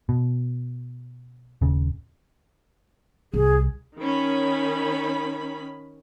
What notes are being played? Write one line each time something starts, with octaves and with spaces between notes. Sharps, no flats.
B2
D#1 C#3
C2 G#4
D#3 C#4 B5